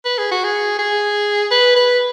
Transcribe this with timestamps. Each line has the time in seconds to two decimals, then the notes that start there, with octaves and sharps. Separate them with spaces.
0.05 B4
0.18 G#4
0.31 F#4
0.44 G#4
0.79 G#4
1.51 B4
1.76 B4